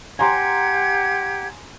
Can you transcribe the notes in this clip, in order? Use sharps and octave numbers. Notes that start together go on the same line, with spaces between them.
G4 F#5 G#5 A#5 C6 G#6